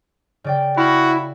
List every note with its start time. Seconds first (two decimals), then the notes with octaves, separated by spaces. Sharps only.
0.44 C#3 D5 G5
0.77 E4 F#4 F5